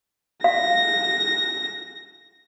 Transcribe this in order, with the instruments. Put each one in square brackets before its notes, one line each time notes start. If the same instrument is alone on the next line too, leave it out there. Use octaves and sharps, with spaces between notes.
[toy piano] F5 [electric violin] A#6